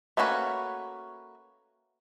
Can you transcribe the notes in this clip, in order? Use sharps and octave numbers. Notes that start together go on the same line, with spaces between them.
A3 A#3 C#4 F#4 B4